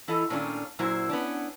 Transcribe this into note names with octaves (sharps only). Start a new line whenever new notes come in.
E3 E4 F4 A4 D#5
A#2 D#3 A3 C#4 D4 F4
F#2 A#2 F#3 E4 C5
B3 C#4 D4